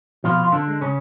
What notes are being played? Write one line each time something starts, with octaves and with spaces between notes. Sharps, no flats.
B2 F3 F4
F4
D3 D4
G#3
C#3 C#4